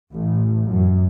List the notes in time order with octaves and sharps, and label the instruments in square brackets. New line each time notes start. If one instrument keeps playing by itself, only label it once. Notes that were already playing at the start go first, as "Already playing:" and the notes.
[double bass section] A1
F#2